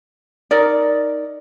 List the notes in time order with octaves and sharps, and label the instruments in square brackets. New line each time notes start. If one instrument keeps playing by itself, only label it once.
[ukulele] D#4 A#4 D5